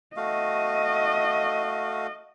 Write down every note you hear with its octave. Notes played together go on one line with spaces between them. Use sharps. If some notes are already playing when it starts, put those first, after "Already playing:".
A3 F#4 D#5 F5